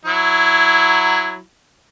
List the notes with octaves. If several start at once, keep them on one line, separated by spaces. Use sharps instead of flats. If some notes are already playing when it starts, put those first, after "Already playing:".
F#3 E4